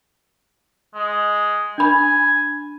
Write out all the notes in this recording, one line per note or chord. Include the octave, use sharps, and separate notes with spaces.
G#3
D4 G#5 B5